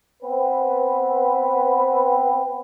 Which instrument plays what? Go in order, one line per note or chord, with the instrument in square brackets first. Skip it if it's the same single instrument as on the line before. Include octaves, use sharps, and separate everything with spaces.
[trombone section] B3 C4 B4